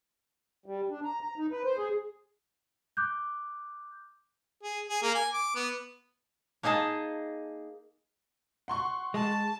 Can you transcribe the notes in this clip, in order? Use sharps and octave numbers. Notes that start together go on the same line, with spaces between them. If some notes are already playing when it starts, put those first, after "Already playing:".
G3
D4
A#5
A#5
D#4
B4
C5
G#4
D6 F#6 G6
G#4
G#4
A#3
G#5
D6
B3
A#3 D#4 G#4 D#5 A5
F#5 C6 C#6
G#3 A5